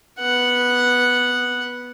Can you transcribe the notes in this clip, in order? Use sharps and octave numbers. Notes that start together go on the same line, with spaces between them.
B3 F#5